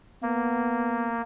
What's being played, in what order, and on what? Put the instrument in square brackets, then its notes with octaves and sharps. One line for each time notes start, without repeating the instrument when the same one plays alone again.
[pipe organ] A#3 [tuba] B3